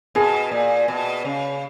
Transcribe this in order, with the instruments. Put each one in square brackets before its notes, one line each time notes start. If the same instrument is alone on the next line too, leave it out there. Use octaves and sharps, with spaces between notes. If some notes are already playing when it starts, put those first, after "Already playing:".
[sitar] B2 [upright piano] G#4
[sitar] A#2
B2
C#3